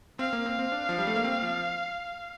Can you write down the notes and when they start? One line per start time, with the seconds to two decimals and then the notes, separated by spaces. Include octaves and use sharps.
0.19 C4 F5
0.33 A#3
0.46 C4
0.59 C4
0.72 D4
0.89 F3
0.98 G3
1.07 A3
1.16 A#3
1.24 C4
1.43 F3